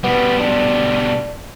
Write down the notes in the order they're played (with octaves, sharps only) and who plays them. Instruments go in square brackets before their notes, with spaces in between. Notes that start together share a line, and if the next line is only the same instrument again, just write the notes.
[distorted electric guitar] B2 G3 [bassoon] B3
[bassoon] D4